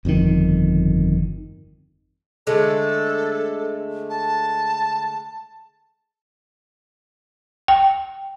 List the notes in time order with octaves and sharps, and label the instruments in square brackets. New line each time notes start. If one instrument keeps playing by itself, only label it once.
[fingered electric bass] G1 F2 G#2 D#3
[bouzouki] D3 G#3 A3 [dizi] A4
[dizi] A5
[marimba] G5